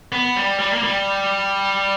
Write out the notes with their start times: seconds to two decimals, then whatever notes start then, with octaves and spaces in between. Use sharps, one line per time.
0.12 B3
0.36 G3
0.59 G3
0.73 A#3
0.83 G3